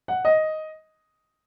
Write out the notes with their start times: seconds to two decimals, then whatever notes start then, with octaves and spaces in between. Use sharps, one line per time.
0.08 F#5
0.25 D#5